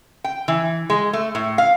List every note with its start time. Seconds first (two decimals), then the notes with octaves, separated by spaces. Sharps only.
0.24 G5
0.48 E3
0.90 G#3
1.13 A3
1.35 A2
1.58 F5